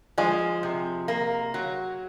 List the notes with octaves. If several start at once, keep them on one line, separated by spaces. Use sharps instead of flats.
F3 G#3
C3
A#3
F#3